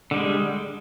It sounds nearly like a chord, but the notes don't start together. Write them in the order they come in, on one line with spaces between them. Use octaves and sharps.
D3 G3 G#3